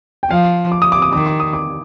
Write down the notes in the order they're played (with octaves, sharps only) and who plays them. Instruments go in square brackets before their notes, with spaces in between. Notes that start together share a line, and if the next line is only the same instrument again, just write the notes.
[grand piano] G5
[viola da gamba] F3 [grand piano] F5
[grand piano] D6
D#6
D6
D#6
[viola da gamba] D#3 [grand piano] D6
[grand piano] D6
D#6
D6